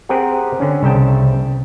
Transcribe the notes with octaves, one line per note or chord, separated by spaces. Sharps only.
C4 G4 G#4 A#4 F#5
D3 C#4
C2 C#3 E5 G5 A5